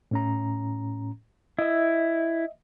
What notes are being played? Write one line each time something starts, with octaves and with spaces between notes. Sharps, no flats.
A2 C#4 A#5
E4 D#5 E5